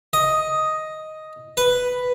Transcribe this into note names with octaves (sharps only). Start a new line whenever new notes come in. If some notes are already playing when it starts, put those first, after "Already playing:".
D#5
B4